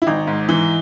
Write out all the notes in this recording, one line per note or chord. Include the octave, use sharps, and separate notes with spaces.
E4
G#1 D#4
G#2
E3